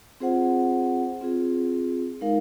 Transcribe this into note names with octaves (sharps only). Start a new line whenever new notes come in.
C4 F4 G#4 C5 F#5
C4 F4 G#4
G#3 D#4 A#4 F5